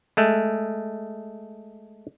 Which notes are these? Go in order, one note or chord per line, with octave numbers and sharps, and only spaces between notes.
G#3 A3